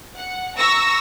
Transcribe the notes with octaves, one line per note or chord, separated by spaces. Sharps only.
F#5
A#5 C#6 E6 A#6